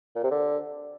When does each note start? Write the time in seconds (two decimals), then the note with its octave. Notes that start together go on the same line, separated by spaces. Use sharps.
0.16 A#2
0.23 C3
0.31 D3